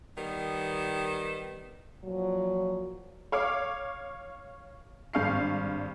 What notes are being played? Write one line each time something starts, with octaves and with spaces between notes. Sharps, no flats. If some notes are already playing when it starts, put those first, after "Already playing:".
D#3 G3 B3
A#2 F3 F#3
C#5 F5 D6
G#1 G2 F5 C#6 C7